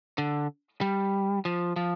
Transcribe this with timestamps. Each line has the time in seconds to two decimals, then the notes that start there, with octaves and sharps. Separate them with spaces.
0.18 D3
0.81 G3
1.45 F3
1.76 F3